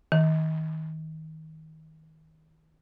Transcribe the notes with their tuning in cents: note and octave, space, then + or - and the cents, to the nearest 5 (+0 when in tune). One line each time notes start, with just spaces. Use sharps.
D#3 +25